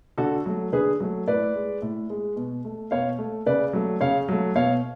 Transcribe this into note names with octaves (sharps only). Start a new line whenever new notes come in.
D3 F#4 A4
F#3 A3
D3 G#4 B4
F#3 A3
A2 B4 D5
G#3
A2
G#3
B2
A3
B2 C#5 F5
A3
C#3 B4 D5
F#3 A3
C#3 C#5 F5
F#3 A3
B2 C#5 F5